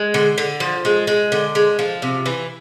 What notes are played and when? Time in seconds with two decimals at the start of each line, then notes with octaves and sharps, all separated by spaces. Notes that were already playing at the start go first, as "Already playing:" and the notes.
Already playing: G#3
0.14 D3
0.38 D3
0.60 F3
0.85 G#3
1.07 G#3
1.32 D3
1.55 G#3
1.79 F3
2.02 C3
2.26 E3